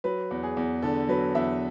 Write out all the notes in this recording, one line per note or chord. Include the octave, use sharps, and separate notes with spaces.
F#3 B4
E2
G#4
E2
D3 A4
F#3 B4
E2 E5